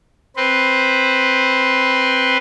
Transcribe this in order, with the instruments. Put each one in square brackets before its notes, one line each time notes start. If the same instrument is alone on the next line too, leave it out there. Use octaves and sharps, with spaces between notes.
[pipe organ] C4 B4 C5